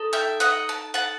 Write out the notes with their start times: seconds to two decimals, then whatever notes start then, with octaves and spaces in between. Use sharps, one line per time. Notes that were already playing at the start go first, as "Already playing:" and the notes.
Already playing: D#4 A4
0.13 E5 G5
0.40 D#5 F#5
0.69 A5
0.94 F#5 A5